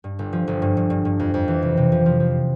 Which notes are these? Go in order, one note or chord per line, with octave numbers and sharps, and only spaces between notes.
G2
G1
F3
G1
G2
G2
G2
G2
F2
F2
E3
C3
C3
F3
F3
F3